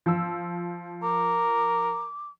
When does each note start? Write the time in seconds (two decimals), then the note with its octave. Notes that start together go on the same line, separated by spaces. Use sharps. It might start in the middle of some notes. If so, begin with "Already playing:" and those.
0.06 F3 E6
1.03 A#4 D6